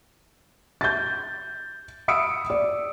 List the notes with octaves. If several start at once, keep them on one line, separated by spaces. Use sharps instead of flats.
G6 A6
B5 D#6 E6 C#7 D7
D5